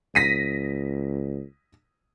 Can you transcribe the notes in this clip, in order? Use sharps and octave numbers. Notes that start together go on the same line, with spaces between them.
C#2 A#6 B6 D#7